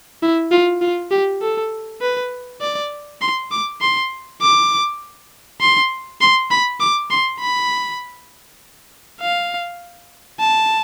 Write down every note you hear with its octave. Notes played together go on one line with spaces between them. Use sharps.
E4
F4
F4
G4
A4
B4
D5
C6
D6
C6
D6
C6
C6
B5
D6
C6
B5
F5
A5